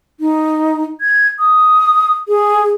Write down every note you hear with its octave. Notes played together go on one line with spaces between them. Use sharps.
D#4
G#6
D#6
G#4